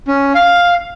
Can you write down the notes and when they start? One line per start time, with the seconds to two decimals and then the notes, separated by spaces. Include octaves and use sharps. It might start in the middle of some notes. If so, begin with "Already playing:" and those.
0.08 C#4
0.35 F5